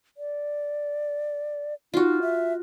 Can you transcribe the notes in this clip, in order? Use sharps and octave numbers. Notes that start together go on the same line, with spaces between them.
D5
D#4 F4 F#4
E5